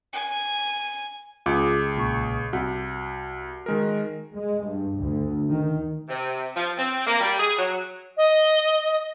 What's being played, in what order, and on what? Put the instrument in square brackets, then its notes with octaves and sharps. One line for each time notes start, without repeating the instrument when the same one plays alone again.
[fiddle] G#5
[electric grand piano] C#2 G#4 D6 [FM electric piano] F4
[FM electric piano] B1 A#2 C#6
[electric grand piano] C2 [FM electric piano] F#4
[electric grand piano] D#3 G#3 A#4
[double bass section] G#3
G2
D2
D#3
[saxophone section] C3
F3
C4
A#3
G3
G#4
F#3
[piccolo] D#5